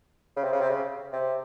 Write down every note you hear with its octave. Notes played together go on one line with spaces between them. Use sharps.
C#3
C3
C#3
C3
C#3
C3